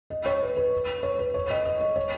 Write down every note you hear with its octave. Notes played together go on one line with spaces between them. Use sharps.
D#5
C#5
B4
B4
C#5
B4
C#5
D#5
D#5
D#5
C#5